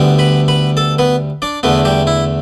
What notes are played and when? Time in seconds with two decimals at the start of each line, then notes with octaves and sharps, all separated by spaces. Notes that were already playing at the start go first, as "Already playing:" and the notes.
Already playing: D2 D3 G3 B3
0.19 B4 B5
0.48 B4 B5
0.77 A4 A5
0.98 B3 B4
1.42 D4 D5
1.63 E2 D3 A3 B3 B4
1.85 G3 G4
2.07 E4